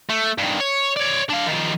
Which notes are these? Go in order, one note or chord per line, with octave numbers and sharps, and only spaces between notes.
A3
G2 D#3
C#5
C#5 D5
D4 F5
D#3 F3